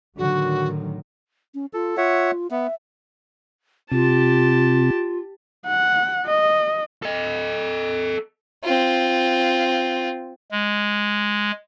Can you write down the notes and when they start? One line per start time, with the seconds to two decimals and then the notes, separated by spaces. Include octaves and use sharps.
0.18 A2 D3 D#3 F#3 F#4
1.54 C#4
1.74 F4 A4
1.97 F4 C#5 E5 F#5
2.51 B3 E5
3.91 C3 F4 G4 A5
5.67 F#5
6.26 D#5
7.03 A4 D#5
8.64 C4 F4
10.51 G#3